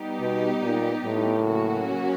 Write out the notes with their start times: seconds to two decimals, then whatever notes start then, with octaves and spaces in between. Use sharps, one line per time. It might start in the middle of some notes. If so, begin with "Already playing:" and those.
Already playing: G3 B3 D#4 G4
0.20 B2
0.62 A#2
1.05 A2
1.46 C#3 F#3 A#3 C#4 F#4